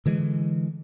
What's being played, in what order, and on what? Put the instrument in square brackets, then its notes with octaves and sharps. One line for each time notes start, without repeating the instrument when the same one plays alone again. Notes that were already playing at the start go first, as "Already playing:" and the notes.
[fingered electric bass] D3 E3 G#3